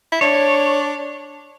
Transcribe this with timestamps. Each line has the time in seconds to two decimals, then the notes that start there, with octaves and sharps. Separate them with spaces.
0.12 E4
0.21 D4 C#5